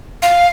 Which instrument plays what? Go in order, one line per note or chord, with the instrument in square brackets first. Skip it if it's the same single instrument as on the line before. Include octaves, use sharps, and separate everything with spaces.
[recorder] F5